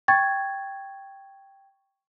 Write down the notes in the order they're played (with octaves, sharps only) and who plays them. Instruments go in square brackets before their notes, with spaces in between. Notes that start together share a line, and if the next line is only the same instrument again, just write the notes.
[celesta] G5 C#6 G#6 A6